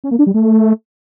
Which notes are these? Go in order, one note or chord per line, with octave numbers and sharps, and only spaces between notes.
C#4
A#3
D4
G3
A3